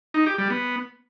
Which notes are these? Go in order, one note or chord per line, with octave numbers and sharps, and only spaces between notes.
D#4
G4
G3
B3